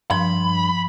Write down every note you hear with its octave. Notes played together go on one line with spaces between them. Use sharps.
G2 F3 B5 C6